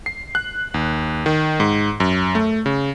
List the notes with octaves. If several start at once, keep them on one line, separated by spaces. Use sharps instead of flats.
C7
F#6
D#2
D#3
G#2
F#2
A3
C#3